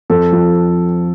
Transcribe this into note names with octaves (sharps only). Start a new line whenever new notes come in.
F2 A4
F3